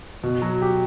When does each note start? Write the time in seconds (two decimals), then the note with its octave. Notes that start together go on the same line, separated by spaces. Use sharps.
0.23 B2
0.42 F#3
0.62 G4